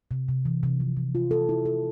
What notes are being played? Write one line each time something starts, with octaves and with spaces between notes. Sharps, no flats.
C3
C3
E3
C3
F3
C3
F4
A4
E4
A4